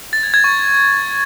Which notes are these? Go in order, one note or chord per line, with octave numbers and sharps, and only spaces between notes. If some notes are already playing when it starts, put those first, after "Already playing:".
A6
G#6
G#6
C#6